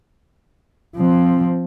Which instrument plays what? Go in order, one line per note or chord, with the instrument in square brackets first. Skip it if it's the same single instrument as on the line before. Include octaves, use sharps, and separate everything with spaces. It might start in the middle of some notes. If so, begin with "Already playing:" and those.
[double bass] F3 C4